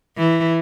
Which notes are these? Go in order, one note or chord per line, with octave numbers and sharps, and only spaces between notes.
E3